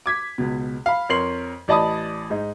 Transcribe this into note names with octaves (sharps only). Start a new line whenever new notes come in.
D6 G#6 B6
C#2 B2
F5 B5
F2 A#4 C#5 C6 C7 F#7
A1 D5 D#5 A5 B5 D#6
G#2 D#4